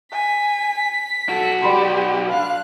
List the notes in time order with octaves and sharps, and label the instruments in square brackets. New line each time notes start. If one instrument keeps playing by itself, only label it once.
[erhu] G#5 [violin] B6
[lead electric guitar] B1 F#4 [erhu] A4
[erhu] G4 [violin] B4 [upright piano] D5 B5 C6
[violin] D4 F#6 [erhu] F5